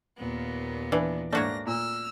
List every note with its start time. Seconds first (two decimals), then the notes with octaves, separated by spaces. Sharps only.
0.18 D#2 A#2 B3
0.92 E3 D4
1.33 G#2 A3 A#3 D4 F#4 C#5 A#6
1.67 A#2 E6 F6